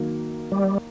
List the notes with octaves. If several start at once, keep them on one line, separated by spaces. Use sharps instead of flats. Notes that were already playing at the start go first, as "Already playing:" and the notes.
Already playing: D#3 F#3 A#3
G3